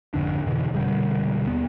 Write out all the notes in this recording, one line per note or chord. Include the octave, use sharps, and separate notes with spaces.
G#1 F2 D3 D4
F2 B2 D3 E3
F1 B2 D3 G3
D#2 B3